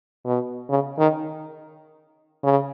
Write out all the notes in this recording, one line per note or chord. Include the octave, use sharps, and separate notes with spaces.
B2
C#3
D#3
C#3